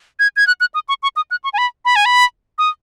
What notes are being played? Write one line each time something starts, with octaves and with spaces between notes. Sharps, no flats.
G#6
G#6
F#6
F#6
D#6
C#6
C#6
D#6
F#6
C#6
G#5
B5
B5
G#5
B5
D#6